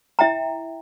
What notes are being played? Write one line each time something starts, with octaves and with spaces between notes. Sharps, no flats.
E4 E5 G5 A#5